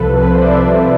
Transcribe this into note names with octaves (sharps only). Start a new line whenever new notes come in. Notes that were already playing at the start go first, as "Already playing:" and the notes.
Already playing: C2 C3 F3 A4 B4
B4
C5
D5
E5